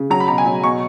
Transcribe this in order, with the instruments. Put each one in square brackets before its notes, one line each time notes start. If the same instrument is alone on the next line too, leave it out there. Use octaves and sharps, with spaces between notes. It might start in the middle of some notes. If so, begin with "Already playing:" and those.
Already playing: [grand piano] C#3
F#3 A#5
B5
B2 A#5
G#5
F#3
B2 C#6